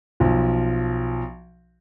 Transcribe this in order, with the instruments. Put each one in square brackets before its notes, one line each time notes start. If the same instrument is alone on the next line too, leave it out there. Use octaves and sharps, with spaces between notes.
[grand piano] B1 F3